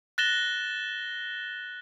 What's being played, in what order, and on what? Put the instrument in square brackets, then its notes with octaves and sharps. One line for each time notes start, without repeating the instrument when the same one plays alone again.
[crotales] F#6 A6 A#6 E7 G7